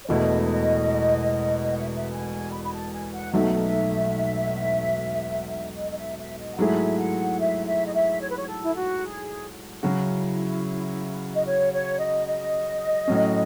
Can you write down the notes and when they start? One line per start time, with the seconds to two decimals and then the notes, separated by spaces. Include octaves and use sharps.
0.04 C#5
0.09 E1 E2 B2 A3 E4 D#5
1.71 F#5
1.79 E5
1.88 D#5
1.96 E5
2.11 G#5
2.52 B5
2.63 B5
2.73 A5
2.92 G#5
3.14 F#5
3.33 B1 B2 F#3 A3 D#4 E5
5.77 D#5
5.91 D#5
5.97 E5
6.18 E5
6.38 D#5
6.53 F#5
6.58 G#2 F#3 A3 E4 G#4 E5
6.98 F#5
7.39 E5
7.66 E5
7.86 D#5
7.93 E5
8.20 C#5
8.29 B4
8.37 C#5
8.48 A4
8.62 E4
8.74 F#4
8.98 A4
9.02 G#4
9.83 C#3 F#3 C#4 E4 F#4
11.35 D#5
11.45 C#5
11.72 C#5
11.99 D#5
12.27 D#5
13.08 A2 F#3 C#4